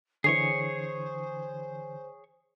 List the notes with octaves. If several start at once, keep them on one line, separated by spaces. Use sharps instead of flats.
D3 E3 G#4 C5 C#5 C#6 C7